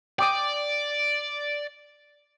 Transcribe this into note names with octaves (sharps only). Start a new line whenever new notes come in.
D5 G5 D6 D#6